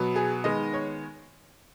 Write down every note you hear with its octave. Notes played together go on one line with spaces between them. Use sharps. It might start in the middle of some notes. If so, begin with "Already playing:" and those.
Already playing: B2 F#3 B3
G#4
D#3 G#3 B3 D#5
C#5